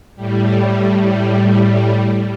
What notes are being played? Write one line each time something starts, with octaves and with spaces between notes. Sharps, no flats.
A2 G3